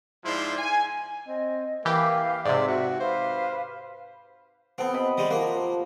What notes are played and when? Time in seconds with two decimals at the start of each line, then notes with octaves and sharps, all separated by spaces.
0.24 G#2 F3 E4 D5 C6
0.58 G#5
1.28 C4 D#5
1.85 E3 A#3 G4 B4 F5
2.45 G#2 C3 D5 E5
2.68 F#4
3.00 B4 C5 F5 D6
4.78 B3 C4 A4 F#5
4.93 C3 D#5 B5
5.18 G3 G#3
5.31 F3 A#3 F#5